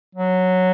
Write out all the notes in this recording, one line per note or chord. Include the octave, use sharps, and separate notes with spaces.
F#3